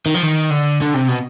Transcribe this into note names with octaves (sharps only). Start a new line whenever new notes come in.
D#3
F3
D#3
D3
D3
C3
B2